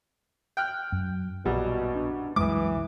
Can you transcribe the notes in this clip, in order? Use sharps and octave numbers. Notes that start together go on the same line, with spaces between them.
G5 F6 F#6
F#2
A#1 F#2 B2 G3
D4
C2 F#2 E3 G#3 D6 D#6